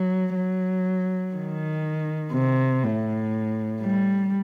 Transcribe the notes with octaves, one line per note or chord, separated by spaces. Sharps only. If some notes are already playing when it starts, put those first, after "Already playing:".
Already playing: F#3
F#3
D#3
C3
A2
G3